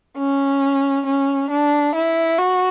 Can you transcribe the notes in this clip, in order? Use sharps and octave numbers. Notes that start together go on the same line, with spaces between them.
C#4
C#4
D4
E4
F#4